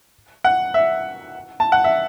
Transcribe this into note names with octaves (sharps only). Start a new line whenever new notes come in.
F#5
E5
A5
F#5
E5